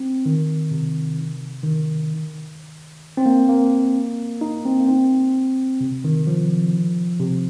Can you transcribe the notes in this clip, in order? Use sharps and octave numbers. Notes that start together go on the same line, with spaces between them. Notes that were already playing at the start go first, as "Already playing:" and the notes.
Already playing: C4
D#3
C3
D#3
C4
A#3
A#3
D#4
C4
A#3
C4
C3
D#3
F3
C3